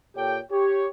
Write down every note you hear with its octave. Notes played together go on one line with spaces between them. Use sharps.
A#2 G4 A4 C#5 G5
G4 C#5